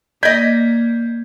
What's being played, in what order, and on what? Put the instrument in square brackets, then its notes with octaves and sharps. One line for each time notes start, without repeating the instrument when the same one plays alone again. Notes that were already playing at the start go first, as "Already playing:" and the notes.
[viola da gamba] A#3 [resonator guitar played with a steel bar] D5 D#5 [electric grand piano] G6 G#6 B6